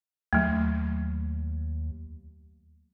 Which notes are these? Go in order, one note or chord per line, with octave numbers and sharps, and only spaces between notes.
D#2 F#3 A3